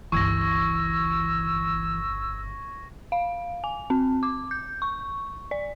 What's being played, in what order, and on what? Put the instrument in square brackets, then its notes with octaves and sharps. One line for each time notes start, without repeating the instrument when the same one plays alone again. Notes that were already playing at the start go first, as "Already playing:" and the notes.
[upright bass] G1 C#2 [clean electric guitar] E3 [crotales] C#6 G#6 A#6 [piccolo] E6
[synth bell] F5
G#5
C4
D6
G6
C#6
D5